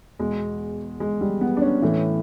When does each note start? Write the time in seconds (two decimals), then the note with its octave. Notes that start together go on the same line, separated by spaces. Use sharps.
0.19 E2 B2 G#3
1.00 G#3
1.21 G3
1.41 B3
1.57 D4
1.62 C#4
1.82 A2 E3